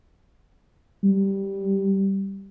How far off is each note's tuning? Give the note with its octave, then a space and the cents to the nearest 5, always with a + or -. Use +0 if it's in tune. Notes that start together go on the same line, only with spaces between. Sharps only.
G3 -5